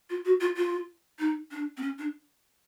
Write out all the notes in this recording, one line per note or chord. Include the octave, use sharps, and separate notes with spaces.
F4
F#4
F4
F4
D#4
D4
C4
C#4
D4